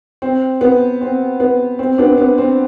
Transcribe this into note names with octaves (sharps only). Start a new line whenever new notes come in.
C4
B3
C4
B3
C4
B3 D4
B3
C4